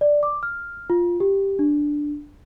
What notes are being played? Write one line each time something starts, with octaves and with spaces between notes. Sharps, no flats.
D5
D6
F6
F4
G4
D4